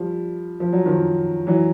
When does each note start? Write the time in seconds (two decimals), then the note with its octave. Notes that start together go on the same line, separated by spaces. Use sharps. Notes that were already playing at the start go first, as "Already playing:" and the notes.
Already playing: F3 G3
0.60 F3
0.73 F#3
0.86 D#3 F3
1.47 E3 F#3